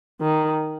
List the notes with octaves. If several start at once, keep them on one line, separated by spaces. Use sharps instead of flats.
D#3